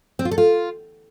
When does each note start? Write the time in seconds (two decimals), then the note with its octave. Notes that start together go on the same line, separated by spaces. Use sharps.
0.19 C4
0.25 F4
0.31 A4
0.38 F4